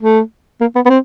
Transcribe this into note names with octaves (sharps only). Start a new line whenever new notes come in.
A3
A#3
B3
B3
C4